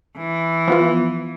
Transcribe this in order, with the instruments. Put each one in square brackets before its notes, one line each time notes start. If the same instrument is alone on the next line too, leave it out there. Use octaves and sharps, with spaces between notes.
[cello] E3
[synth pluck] F3 B3 F4